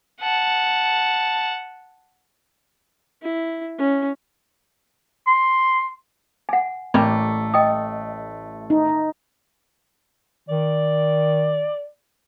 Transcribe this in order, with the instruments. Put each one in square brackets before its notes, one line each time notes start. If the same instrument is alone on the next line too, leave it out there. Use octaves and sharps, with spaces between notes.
[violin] F#5 A5
[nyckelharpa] E4
C#4
[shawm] C6
[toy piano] F#5 G#5
[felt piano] A1 [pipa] G3 A3 A#3
[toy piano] D#5 G5 D#6
[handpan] D#4
[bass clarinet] D#3 [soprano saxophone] D5